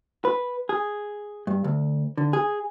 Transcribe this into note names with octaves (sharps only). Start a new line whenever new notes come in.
B4
G#4
G2
D2
D3
G#4